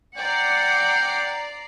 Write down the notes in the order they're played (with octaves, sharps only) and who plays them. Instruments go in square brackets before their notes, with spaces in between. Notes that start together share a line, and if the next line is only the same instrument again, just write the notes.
[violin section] D5 A#5 C7 [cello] F#5 [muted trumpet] G5